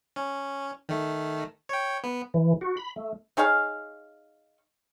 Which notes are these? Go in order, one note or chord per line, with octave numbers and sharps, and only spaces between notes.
C#4
D#3 A3
C#5 G5
B3
E3
F#4
B5
A3
D#4 G#4 C#5 F5